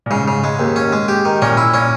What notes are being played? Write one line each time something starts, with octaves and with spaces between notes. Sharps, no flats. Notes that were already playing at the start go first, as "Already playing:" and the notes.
A#2
G#2 C#3
C#3
G#3
D#2
C#4
G#3
G4
D#3
A#2 C#4
E4
A#2 C#4